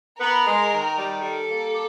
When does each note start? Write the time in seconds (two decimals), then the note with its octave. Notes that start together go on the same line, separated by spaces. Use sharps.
0.20 B3 A#4
0.45 G#3
0.71 D#3
0.97 G3
1.21 G3 A4
1.48 A#3
1.73 G4